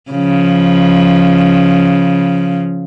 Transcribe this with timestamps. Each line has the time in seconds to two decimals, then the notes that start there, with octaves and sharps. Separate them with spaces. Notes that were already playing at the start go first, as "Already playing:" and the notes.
0.11 C#3 F3